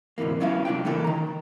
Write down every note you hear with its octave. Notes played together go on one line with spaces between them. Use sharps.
D2 G#2 C3 E3 A#3
F#3 B3 C#4 E4 F4 F5
C2 D4 F4 G5
A2 C#3 E3 A#3 A4
D#3 A#5